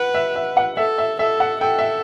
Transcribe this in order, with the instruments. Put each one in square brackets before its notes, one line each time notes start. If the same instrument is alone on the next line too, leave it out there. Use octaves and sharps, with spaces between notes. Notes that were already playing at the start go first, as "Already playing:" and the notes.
Already playing: [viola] B4 [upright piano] F#5
[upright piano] E5
E5
F#5
[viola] A4 [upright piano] E5
[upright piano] E5
[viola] A4 [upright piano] E5
[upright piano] F#5
[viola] A4 [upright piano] G5
[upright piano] E5